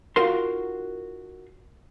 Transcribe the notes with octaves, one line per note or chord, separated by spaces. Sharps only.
D#4 F4 F#4 A#4 C6